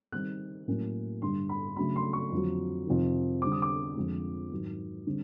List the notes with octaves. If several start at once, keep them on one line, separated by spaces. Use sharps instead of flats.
D#3 G3 C4 D#4 F#6
A2 F#3 A#3 C#4
G2 D3 G3 C6
B5
C#3 F#3 A3 D4 B5
C6
C#6
F2 D3 F#3
F2 C3 D#3
D3 G3 C4 D6
D#6
D6
F2 D3 F3 G#3
G#2 D#3 F#3
D3 G3 C4